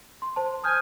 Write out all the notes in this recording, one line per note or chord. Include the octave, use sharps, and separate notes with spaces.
C6
C5 A5
G#5 D#6 F6 G6